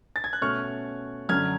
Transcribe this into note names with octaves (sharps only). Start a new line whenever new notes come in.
A6
G#6
F#6
B2 A3 C#4 C#6 F6
F#2 D3 F#3 C#4 F6 G#6